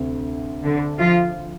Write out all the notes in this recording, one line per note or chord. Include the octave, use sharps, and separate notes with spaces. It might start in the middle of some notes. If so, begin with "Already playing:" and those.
Already playing: D2 C3
D3
F3 F4